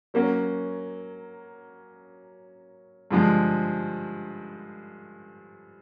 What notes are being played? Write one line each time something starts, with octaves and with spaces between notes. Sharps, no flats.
F#3 A#3 C#4 F#4
G2 D3 F3 G#3